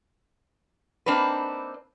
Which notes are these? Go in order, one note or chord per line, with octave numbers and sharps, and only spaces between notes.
A#3 C4 D4 D#4 B4